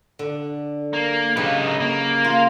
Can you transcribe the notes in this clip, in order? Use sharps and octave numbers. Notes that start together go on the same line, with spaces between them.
D3
A#3
C#3 F#3 D#4 G4 B4
A#3
F4